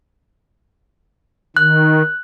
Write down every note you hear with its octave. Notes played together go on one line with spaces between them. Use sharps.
D#3 F#6